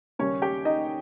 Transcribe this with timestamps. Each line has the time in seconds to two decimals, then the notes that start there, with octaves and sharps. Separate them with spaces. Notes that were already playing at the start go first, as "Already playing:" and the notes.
0.19 D#2 C#3 G3 C#4 C#5
0.42 G4 G5
0.65 D#4 D#5